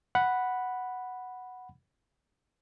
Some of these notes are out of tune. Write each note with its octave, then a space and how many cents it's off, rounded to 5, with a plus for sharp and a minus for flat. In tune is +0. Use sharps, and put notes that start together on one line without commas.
F#5 +0 B5 +0